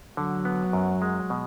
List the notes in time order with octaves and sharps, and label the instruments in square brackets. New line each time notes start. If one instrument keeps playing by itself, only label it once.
[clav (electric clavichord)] D3 [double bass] F#3
[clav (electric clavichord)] B3
F#2
G#3
B2